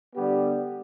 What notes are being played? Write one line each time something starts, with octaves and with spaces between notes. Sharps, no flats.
D3 G3 B3 G4